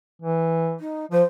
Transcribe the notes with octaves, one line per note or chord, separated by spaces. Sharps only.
E3
D#4
F3 C5